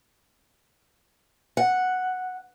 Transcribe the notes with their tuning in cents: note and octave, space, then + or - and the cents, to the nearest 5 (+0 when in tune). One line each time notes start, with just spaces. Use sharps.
F#5 -5